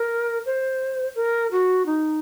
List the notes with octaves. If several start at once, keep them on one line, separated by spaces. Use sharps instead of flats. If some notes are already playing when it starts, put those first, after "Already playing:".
Already playing: A#4
C5
A#4
F#4
D#4